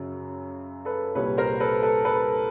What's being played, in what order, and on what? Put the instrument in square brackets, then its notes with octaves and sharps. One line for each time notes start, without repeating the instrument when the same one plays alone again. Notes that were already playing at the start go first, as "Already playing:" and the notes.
Already playing: [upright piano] F#2 C#3 F#3
A4 B4
C2 A#2 G3 B4 C#5
A#4 C5
A4 B4
A4 B4
A4 B4